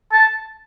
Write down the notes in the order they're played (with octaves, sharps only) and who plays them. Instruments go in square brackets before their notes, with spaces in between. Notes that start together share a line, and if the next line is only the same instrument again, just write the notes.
[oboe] A5